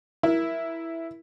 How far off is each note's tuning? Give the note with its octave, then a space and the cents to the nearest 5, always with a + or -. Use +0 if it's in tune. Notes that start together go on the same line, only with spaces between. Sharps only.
E4 +0 A#4 +20